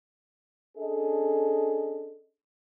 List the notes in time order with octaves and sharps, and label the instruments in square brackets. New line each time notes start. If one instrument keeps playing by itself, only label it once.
[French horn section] C#4 D4 G#4 A4 D#5